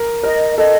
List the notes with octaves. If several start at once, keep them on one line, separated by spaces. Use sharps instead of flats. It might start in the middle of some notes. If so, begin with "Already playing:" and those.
Already playing: A#4
A#4 D#5
A4 D#5